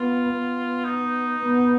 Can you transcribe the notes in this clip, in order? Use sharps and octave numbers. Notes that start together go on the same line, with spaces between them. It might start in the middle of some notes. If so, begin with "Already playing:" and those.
Already playing: B3 F4
B3
D#4
B3